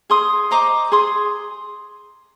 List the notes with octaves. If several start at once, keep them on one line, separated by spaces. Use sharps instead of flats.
G#4 C6 D#6
C5 D#5 A#5 D6
G#4 C6 D#6